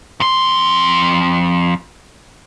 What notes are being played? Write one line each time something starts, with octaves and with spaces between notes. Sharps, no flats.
F2 C6